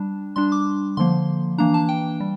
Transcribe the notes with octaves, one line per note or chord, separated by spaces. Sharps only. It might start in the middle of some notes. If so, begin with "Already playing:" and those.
Already playing: G3 D4
G3 D4 C6
D6
D3 F3 A#3 C6
E3 A#3 D4 A#5
A5
G5
G3